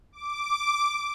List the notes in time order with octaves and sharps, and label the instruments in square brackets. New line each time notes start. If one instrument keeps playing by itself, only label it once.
[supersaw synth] D6